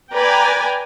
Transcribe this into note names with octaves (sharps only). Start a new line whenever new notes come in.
B4 D5 G5 G#5 A#5